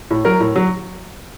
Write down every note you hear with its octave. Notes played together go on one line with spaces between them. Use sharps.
A2
F#3 A#4
A2
F#3